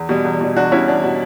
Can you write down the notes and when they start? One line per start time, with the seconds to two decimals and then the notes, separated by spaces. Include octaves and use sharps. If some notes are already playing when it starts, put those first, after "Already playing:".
Already playing: E2
0.09 B2 G3
0.25 E2
0.41 B2 G3
0.56 E2 D4 F#4
0.72 B2 G3 C#4 E4
0.88 E2 D4
1.03 B2 G3